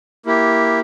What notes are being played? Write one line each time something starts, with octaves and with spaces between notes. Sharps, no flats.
A#3 E4 G4